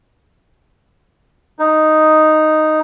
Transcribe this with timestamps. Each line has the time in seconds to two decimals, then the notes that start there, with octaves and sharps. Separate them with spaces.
1.59 D#4